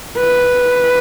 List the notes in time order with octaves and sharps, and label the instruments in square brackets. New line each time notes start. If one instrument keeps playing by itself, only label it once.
[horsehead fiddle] B4